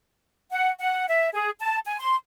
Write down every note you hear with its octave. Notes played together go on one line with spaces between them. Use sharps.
F#5
F#5
E5
G#4
A5
G#5
C6